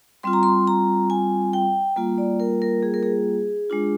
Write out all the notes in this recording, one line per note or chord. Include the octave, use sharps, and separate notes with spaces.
G3 C4 F4 C6
A#5
C6
A#5
G#5
G5
G3 A#3 F4
D5
A#4
A#4
G#4
A#4
G#4
G#3 D4 F4